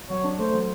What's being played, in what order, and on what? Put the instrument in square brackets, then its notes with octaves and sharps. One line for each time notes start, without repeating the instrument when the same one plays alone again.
[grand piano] F#3 [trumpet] C#5
[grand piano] D4
[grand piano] A3 [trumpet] C5
[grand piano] F#3